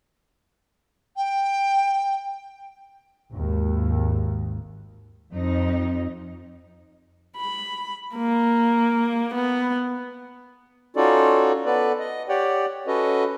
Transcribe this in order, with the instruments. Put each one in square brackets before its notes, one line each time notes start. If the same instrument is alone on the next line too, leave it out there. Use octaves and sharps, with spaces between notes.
[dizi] G5
[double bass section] G#1 D#2
[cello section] F2 D#4
[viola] B5
A#3
B3
[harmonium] C#4 D#4 F4 F#4 A4 D5
B3 A4 B4 D5
D#5
G4 C#5 D5 F#5 G5
C#4 F#4 A4 B4 D#5